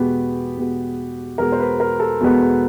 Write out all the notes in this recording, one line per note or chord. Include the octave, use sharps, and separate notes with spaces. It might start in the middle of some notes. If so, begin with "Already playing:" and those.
Already playing: E2 B2 G#3 B3 G4
E2 B2 G#3 B3
E2 B2 G#3 B3 A#4
C5
B4
A#4
A4
E2 B2 G#3 B3